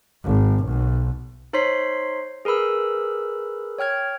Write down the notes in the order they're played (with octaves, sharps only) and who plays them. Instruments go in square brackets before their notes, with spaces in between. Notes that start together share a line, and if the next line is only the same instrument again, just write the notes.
[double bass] G#1
B1
[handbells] D#4 C5 C#5 C6 B6 C7
G#4 A#4 B4 B5 E6
C#5 G5 F6 G#6